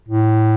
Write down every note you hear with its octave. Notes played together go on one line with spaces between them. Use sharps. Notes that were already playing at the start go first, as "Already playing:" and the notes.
A2